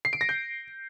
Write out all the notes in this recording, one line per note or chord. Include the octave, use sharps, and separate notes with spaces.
C7
D7
A#6
G6